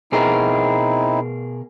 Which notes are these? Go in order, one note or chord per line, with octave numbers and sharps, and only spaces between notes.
B2 C4 D#4 E4 G#4 A#4